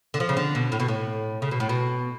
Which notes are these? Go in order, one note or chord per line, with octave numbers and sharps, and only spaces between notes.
D3
F3
C#3
D3
B2
A2
B2
A2
C#3
B2
A2
B2